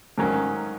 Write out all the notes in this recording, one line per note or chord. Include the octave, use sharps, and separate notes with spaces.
G#2 D#3 F#3 A#3 C#4